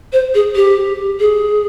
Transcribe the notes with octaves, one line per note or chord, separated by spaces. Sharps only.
C5
G#4
G4
G#4